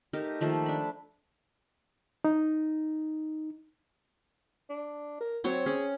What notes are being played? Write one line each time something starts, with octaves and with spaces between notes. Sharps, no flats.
A3 D#4 G4 A#4
D#3 F3 A3 A#3
D4 B5
D#4
D4
A#4
F#3 C4 C#5
C#4 G#4